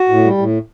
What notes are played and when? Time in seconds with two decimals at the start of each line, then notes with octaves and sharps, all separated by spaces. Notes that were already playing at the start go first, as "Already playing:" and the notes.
Already playing: F#4
0.09 A2
0.24 G3
0.38 A2